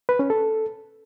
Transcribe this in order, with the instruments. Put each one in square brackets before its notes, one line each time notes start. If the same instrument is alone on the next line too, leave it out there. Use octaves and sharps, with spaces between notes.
[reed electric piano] B4
C#4
A4